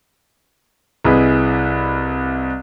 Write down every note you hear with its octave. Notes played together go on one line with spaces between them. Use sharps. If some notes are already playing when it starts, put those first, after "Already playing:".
C2 E4 G#4 B4 D#5